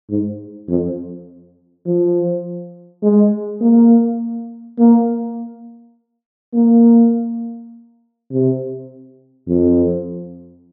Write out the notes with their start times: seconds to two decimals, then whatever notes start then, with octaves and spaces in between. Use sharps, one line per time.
0.10 G#2
0.69 F2
1.86 F3
3.03 G#3
3.62 A#3
4.79 A#3
6.54 A#3
8.31 C3
9.48 F2